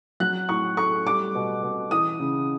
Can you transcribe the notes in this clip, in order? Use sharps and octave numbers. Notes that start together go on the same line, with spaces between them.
F#3 F#6
A2 C#6
A3 C#6
G3 D6
B2
B2
E3 D#6
C#3